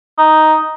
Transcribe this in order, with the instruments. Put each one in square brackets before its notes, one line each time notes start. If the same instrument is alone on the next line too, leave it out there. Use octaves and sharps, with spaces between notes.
[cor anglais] D#4